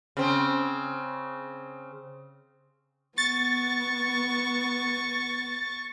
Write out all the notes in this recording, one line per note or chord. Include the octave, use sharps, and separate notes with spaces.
C#3 C4
B3 C#6 A6